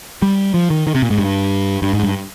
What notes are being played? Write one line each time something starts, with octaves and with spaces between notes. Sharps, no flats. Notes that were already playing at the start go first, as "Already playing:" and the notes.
G3
F3
D#3
D#3
C3
A#2
G#2
G2
G2
G#2
G2